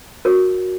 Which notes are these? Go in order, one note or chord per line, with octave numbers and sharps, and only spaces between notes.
F#4 A#4 C#5